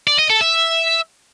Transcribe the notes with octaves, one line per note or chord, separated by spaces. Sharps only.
D5
D#5
A4
E5